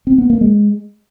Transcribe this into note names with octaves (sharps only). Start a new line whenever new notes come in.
C4
B3
A#3
G#3